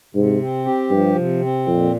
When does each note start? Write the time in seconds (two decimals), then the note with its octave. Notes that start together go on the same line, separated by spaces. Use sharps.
0.15 G#2 C3
0.39 C4
0.65 G4
0.90 G2 F3
1.15 C3
1.41 C4
1.66 F2 A#2